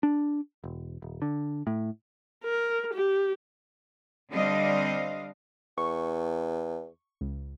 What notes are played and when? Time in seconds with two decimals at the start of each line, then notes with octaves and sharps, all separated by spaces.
0.03 D4
0.64 E1
1.02 D#1
1.22 D3
1.67 A2
2.44 A#4
2.94 G4
4.31 D3 G3 C4 D4 D#5 F5
5.78 E2 C#6
7.21 C#2